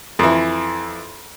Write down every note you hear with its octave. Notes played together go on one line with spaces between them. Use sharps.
F2 E3